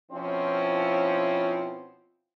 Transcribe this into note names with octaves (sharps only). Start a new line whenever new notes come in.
B2 F3 C4 C#4 E4 F4